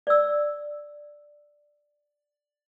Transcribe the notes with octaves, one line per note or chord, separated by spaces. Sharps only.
D5 E6